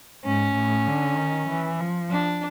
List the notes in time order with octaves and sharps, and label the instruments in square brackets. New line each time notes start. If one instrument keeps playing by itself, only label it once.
[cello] G#2 [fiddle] C#4
[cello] A2
D3
D#3
E3
F3
[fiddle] D4